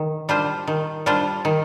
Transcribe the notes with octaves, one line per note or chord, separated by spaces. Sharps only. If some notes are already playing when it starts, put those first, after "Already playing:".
Already playing: D#3
G3 D4 F4 C5
D#3
G3 D4 F4 C5
D#3